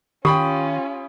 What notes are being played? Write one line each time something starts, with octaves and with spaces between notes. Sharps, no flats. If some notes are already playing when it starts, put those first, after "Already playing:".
D#3 C#4 F4 G4 G5 B5 D#6